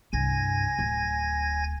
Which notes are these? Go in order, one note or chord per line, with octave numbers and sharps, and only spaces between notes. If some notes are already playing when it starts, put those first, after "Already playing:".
C2 G2 G#5 G#6 A#6
D1